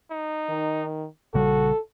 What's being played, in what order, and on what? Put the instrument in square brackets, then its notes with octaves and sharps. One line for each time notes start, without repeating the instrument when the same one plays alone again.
[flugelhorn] D#4
[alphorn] D#3
[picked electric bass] A#1 C#3 G3 [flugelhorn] F#4 [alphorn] A4